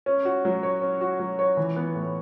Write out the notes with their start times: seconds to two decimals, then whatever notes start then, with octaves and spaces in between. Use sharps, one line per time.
0.06 C#4
0.25 F#4
0.45 F#3
0.63 C#5
0.81 C#4
1.01 F#4
1.20 F#3
1.39 C#5
1.57 E3
1.76 B3
1.95 A2